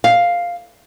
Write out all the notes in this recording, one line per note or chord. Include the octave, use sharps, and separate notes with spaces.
F5